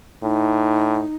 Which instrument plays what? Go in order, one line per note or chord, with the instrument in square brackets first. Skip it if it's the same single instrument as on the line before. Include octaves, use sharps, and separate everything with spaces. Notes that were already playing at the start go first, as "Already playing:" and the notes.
[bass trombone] A2 [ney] D#4